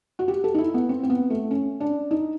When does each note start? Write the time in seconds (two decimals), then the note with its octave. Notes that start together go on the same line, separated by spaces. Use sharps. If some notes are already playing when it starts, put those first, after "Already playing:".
0.19 F#4
0.28 G4
0.44 A4
0.54 D#4
0.58 E4
0.74 B3
0.89 C4
1.03 C4
1.10 B3
1.30 A3
1.51 C#4
1.80 D4
2.11 D#4